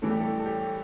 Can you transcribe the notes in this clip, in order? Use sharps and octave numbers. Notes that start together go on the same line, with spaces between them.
A2 E3 G3 A4
G4
A4
A4
G4